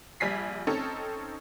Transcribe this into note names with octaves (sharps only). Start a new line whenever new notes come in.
A#1 G3 G#5 B6 C7
C4 C#4 D#4 A4